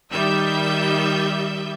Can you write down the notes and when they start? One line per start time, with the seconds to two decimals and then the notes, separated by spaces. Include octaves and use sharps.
0.11 D#3 G3 E5 G6